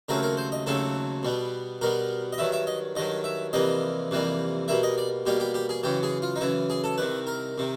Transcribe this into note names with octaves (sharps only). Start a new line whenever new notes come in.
D#2 C#3 F#3 A3 C4 A#4
A#4
C5
D#5
D#2 C#3 F#3 A3 C4 A4
B2 G3 B3
B2 G3 B3 A#4
D#5
G2 D#3 F#3 E5
E5
D#5
G2 D#3 F#3 D#5
E5
F2 C3 E3 G3 A#3 D#5
F2 C3 E3 G3 A#3
B2 G3 A#3 E5
D#5
D5
B2 G3 A#3 G4
G4
G4
G#4
F#2 C#3 E3 G4
G#4
F4
D#4
F#2 C#3 E3 E4
G#4
A4
C2 C3 D#3 B4
A#4
C3 D#3